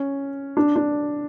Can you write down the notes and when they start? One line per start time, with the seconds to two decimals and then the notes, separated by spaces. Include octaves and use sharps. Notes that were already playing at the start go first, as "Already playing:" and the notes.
Already playing: C#4
0.57 D4
0.76 D4